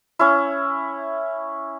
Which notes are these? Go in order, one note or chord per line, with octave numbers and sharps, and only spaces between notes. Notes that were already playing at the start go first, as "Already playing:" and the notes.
C#4 E4